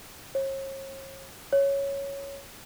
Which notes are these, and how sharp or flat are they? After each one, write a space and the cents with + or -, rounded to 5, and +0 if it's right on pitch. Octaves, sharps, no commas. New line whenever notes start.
C#5 -45
C#5 +0